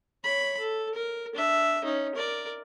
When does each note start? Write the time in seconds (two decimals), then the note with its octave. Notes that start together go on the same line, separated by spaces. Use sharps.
0.24 C#5 B5
0.60 A4
0.95 A#4
1.35 D4 E5
1.84 C#4 D#4
2.15 A#4 D5